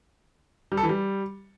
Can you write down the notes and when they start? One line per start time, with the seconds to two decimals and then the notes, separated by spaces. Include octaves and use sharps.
0.72 G3
0.77 A4
0.83 E3
0.89 G3